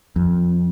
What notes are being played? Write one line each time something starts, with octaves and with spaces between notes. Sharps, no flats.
F2